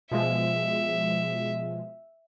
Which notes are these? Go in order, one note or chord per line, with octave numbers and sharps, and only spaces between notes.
B2 F3 G#3 E5